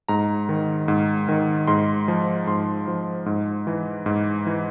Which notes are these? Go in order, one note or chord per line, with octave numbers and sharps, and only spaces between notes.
G#2 A#5
D#3
G#2
D#3
G#2 C6
F3
G#2 C6
F3
G#2
E3
G#2
E3